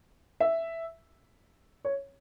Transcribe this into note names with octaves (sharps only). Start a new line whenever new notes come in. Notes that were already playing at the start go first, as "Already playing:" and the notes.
E5
C#5